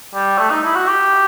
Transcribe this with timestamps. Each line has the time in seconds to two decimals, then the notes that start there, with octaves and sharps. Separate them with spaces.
0.14 G3
0.38 A3
0.50 D#4
0.64 E4
0.75 F#4
0.87 G4